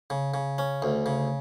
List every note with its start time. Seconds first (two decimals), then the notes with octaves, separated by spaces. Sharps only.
0.10 C#3
0.34 C#3
0.58 C#4
0.82 D2
1.06 C#3